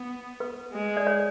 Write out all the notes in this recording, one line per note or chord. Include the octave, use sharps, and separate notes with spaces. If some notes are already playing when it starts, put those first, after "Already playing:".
Already playing: B3
B4
G#3
D5
C#5